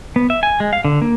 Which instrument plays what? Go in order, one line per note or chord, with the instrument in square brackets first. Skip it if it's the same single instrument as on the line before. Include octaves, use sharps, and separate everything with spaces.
[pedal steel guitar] B3
E5
G#5
G#3
F5
D3
A#3